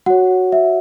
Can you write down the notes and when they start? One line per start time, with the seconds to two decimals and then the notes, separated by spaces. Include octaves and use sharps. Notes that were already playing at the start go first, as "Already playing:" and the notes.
0.06 F#4 C#5 F#5
0.52 E5